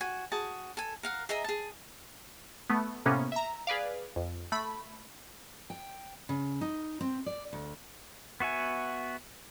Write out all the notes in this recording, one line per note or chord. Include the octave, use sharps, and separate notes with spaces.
F#4 G#5
F#4 G#4 A5
A4 G#5
A#4 F5 F#5
G#4 D#5 E5 A#5
G#4 A5
A3 B3
A2 C3 A#3 B3 C#4
E5 A#5
G#4 B4 D5 F5
F2
A3 B5
G5
C#3
D#4
C4
D5
D2
B3 F#4 E5 G#5